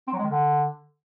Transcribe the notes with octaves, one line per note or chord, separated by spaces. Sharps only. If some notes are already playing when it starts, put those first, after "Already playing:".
C4
F#3
G#3
D#3
D3